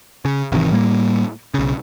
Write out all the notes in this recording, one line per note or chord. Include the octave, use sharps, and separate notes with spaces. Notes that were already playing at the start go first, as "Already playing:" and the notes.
C#3
G#1 C3 D#3 E3
A2 G3 A#3
B1 C#3